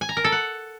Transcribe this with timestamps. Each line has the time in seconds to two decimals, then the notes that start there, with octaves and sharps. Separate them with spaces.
0.01 G#5
0.09 A#5
0.17 A#4
0.24 A4
0.32 F#5